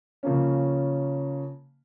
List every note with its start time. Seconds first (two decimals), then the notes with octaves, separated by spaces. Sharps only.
0.23 C#3 F3 A#3 C#4